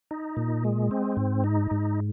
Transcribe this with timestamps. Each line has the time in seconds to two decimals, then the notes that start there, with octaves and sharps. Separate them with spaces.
0.11 D#4
0.37 A#2
0.64 G#3
0.91 C4
1.17 G#2
1.44 D#4
1.71 G#2